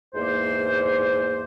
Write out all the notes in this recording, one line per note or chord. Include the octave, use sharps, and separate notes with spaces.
E2 G#2 A#3 C5